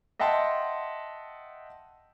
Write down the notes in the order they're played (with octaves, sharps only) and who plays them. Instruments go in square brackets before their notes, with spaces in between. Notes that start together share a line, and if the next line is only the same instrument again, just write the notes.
[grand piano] D#5 E5 F#5 G5 A5 C6